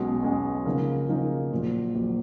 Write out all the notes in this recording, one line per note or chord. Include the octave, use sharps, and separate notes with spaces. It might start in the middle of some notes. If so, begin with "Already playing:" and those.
Already playing: B1 B2 G#3 C#4
B1 B2 G#3 C#4
C#3 F3 A#3 D#4 G#4
C#3 F3 A#3 D#4 G#4
A#1 A#2 F#3
A#1 A#2 F#3